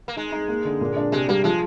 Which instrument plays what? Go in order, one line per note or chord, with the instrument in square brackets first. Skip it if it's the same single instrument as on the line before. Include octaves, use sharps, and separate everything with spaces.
[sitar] A#3
[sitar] G#3 [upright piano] D#4
[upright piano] D#4
A#3
D3
A#2
D4
[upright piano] C3 [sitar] G#3
[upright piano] G3 [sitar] A#3
[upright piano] F3 [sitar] G#3